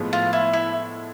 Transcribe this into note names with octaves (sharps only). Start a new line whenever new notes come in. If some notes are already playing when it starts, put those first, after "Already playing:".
Already playing: A2 F3 G#3 B3
F4
E4
E4